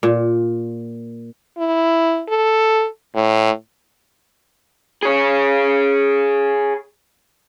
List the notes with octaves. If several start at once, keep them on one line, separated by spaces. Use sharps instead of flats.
A#2
E4
A4
A2
G#4 C#5